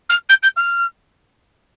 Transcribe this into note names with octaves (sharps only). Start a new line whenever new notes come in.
F6
G6
G6
F6